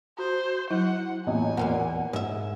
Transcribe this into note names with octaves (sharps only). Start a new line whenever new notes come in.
F#4 C5
F#3 E4 F#5
A1 E2 A#2 G#5
E2 A#2 A#3 F#5
G#2 E5